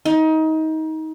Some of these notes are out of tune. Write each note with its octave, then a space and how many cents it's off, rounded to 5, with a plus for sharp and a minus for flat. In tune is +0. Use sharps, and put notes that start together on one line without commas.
D#4 +25